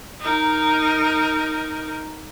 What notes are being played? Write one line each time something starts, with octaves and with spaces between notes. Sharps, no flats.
D#4 A#4